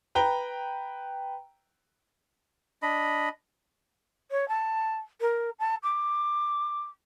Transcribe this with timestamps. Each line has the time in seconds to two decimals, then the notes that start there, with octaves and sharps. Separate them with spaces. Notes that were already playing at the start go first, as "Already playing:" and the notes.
0.15 B4 G5 A#5 G7
2.82 D4 D#5 B5
4.31 C#5
4.48 A5
5.21 A#4
5.59 A5
5.83 D6